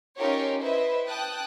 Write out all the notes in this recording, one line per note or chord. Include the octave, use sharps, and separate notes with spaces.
C#4 D#4 F4 G4 A#4 C#5
E4 B4 C5 D#5 E5
G5 A5 D#6 F#6